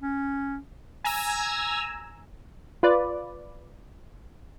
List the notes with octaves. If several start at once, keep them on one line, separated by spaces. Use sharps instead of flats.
C#4
G#5 A#5 E6
F4 B4 D5